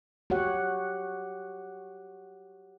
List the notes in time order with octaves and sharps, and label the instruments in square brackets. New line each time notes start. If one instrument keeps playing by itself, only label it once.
[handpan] F#4 G4 C#5 F#5